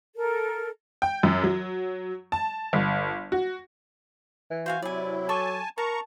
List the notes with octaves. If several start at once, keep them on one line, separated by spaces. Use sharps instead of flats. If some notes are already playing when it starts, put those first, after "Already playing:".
A4 A#4
G5
F#2
F#3
A5
G1
F#4
E3
F#4 C5 F5 G#5
C3 F#3 E4 D5 G#5
A4 G#5 A5 C#6 D6
A#4 A5 A#5 C#6